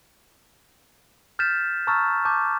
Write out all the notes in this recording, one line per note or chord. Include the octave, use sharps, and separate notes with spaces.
F6 G6 A6 B6 E7
A5 A#5 C#6 E6 F6 A6
A5 C#6 D6 G6